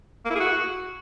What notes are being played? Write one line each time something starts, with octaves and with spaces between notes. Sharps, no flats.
A#3
E4
G#4
F#4